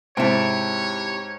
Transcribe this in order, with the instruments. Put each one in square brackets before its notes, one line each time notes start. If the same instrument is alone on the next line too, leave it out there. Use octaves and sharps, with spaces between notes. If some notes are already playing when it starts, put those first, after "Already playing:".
[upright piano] G#2 C5 [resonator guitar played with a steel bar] C3 E4 [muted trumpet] C#5 [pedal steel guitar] G5 A5